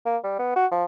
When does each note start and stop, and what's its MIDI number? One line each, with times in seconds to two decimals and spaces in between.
0.06 0.17 58
0.24 0.35 55
0.39 0.52 59
0.56 0.66 66
0.71 0.84 53